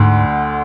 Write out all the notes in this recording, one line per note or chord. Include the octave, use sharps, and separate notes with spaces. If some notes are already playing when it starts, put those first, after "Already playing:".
Already playing: D2 G#2 D3